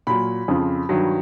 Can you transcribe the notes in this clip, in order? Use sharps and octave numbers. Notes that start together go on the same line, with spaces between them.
A#2 F#3 B5
F2 C#3 F3
G2 D#3 F#3